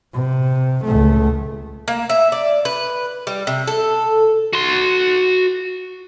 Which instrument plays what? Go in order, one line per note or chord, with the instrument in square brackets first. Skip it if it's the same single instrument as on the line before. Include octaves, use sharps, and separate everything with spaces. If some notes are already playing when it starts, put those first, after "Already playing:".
[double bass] C3
C#2 A3
[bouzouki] A#3
E5
D5
B4
G3
C3
A4
[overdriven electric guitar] F#4 C6